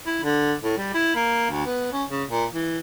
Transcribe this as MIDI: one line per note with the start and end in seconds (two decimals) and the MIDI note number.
0.06 0.24 64
0.24 0.53 50
0.64 0.76 45
0.78 0.91 55
0.94 1.15 64
1.15 1.47 58
1.50 1.65 38
1.66 1.89 59
1.93 2.04 61
2.10 2.24 49
2.29 2.44 46
2.53 2.79 52